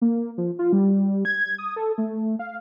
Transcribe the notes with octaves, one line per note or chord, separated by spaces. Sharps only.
A#3
F3
F4
G3
G#6
D#6
A4
A3
F5